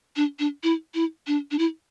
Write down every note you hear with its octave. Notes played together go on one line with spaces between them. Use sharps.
D4
D4
E4
E4
D4
D4
E4